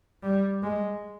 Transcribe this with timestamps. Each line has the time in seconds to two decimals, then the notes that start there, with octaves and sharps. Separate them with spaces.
0.23 G3
0.63 G#3